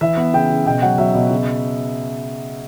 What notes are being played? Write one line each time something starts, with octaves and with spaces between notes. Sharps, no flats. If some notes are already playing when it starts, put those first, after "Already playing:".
E3 E5
B3
C#3 G5
C#3
B2 G5
F#3 F#5
F#3 E5
B2
C#3